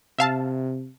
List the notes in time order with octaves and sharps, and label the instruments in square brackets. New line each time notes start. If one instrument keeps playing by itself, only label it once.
[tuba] C3 [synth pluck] E5 F5 A5